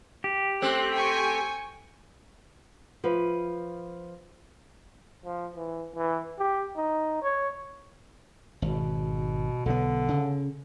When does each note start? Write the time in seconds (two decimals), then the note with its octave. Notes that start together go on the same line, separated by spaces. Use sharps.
0.24 G4
0.62 A3 C4 F#6
0.92 G5 G#5 C#6
3.04 F3 B4 E5 F5
5.25 F3
5.56 E3
5.96 E3
6.39 G4
6.76 D#4
7.22 C#5
8.62 G#1 B2
9.66 B1 D3 B3
10.08 C#3